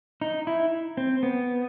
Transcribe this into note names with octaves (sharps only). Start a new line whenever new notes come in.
D#4
E4
C4
B3